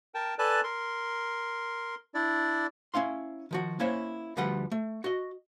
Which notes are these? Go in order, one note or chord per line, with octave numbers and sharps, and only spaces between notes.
A#4 G5 A5
A4 B4 D5 G#5 A5 F#6
A#4 C6
D4 E4 D5
C#4 E4 F5 C6
D#3 F3 F#4
A#3 C#4 E4 C5 C#5 E5
D2 F3 G3 B4 F#5
A3
F#4 D#5